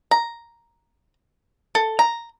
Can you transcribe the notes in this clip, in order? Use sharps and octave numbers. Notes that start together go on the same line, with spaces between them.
A#5
A4
A#5